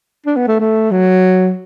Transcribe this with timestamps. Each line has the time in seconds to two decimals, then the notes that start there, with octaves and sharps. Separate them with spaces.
0.26 D4
0.36 B3
0.48 A3
0.59 A3
0.91 F#3